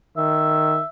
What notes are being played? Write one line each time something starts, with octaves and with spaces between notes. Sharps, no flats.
D#3 E5